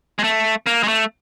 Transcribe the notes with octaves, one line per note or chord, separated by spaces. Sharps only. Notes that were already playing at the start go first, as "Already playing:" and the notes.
G#3
A3
A#3
G#3
A3